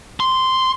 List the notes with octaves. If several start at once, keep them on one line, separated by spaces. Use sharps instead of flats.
C6